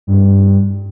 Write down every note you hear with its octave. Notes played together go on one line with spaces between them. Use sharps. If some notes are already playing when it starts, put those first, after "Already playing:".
G2